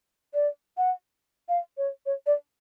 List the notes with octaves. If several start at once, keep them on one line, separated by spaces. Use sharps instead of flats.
D5
F#5
F5
C#5
C#5
D5